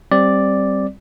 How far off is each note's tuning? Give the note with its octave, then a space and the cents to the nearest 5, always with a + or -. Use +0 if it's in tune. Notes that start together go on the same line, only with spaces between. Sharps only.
G3 -5 C4 +10 D5 +0